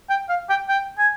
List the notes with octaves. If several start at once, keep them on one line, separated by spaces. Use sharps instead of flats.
G5
F5
G5
G5
G#5